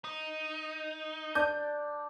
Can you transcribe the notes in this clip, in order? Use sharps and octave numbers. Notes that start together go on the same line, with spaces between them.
D#4
D4 G6